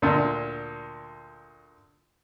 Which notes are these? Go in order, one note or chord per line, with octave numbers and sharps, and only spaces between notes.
D2 A#2